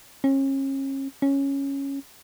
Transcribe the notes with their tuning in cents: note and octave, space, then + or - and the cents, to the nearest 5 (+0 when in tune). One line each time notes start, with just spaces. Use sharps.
C#4 -35
C#4 -5